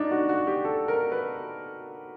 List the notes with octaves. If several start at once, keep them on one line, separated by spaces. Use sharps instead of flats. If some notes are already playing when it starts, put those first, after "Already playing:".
Already playing: D4 D#4
F#4
F#4
G4
A4
A#4
B4